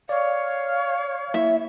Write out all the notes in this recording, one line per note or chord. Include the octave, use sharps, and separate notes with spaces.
C#5 D5 F5
A#3 E4 E5